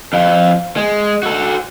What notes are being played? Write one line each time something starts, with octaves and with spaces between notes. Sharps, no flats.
F2 F3
G#3
F#4 A4